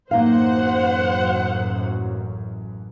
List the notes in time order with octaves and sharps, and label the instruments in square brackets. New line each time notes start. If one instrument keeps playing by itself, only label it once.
[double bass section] A1 F#2 [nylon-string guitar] A#3 D#4 F5 [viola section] C5 F#5